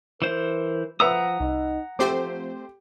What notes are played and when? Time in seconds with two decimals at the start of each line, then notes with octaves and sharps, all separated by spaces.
0.22 E3 A#4 C5
1.00 F3 B4 E5 F#5 A#5 D#6 E6
1.40 C2 D#4
1.99 F3 A3 C4 G4 C5 D6